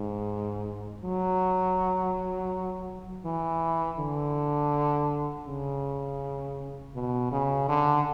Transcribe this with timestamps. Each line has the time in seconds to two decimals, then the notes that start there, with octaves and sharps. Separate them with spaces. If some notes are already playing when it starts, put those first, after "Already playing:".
Already playing: G#2
1.03 F#3
3.25 E3
3.98 D3
5.47 C#3
6.95 B2
7.32 C#3
7.69 D3